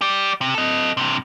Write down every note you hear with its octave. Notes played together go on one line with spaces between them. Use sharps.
G4 D5
C3
A4 D#5
G2 C3